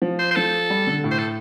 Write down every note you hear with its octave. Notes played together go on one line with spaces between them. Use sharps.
F3
C5
C5
F3 A4
G3
D3
A2
C5
A4